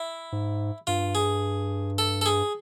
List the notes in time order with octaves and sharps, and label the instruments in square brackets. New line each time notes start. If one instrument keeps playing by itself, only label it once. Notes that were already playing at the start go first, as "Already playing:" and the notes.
Already playing: [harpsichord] E4
[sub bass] G#2
[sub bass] G2 [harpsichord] F4
[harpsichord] G#4
A4
A4
G#4